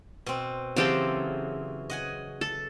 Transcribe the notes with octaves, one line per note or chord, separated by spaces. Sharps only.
B2 C4
C#3 E3 F#3 C4 G4 A4
D#5 F#5 G#5
A4